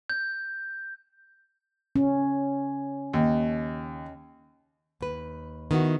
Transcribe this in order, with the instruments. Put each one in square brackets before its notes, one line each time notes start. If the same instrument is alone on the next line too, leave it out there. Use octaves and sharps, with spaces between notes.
[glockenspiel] G6
[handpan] C#4
[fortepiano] D#2
[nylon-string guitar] D#2 B4
D#3 B3 E4 F#4